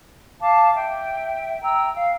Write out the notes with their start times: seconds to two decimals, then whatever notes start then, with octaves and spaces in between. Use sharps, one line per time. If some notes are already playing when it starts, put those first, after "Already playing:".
0.41 F5 A5 D6
0.75 E5 G5
1.63 G5 A#5 E6
1.96 F5